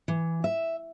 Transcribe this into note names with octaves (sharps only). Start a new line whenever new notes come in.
E3
E5